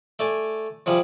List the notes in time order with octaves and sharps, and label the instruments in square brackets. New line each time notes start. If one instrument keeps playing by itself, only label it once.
[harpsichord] A3 D5 G#5
C3 F3 G3 G#4